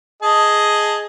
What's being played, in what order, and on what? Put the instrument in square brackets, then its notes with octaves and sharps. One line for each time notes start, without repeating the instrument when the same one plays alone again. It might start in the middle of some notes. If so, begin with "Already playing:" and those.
[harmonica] G#4 D#5 A5